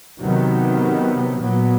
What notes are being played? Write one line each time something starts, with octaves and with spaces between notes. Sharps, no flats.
C3 D#3 F#3 B3
A#2 F#3 B3